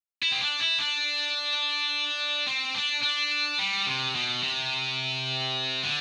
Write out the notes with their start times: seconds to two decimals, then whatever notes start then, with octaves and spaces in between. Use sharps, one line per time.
0.23 E4
0.32 C4
0.41 D4
0.60 E4
0.79 D4
2.47 C4
2.75 D4
3.03 D4
3.59 G3
3.86 C3
4.15 B2
4.43 C3
5.83 D3